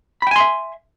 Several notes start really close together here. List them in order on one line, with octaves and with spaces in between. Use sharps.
B5 G5 G#5 C6 E5